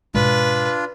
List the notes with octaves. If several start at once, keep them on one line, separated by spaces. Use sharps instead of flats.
G#2 B2 G#3 D4 F4 B4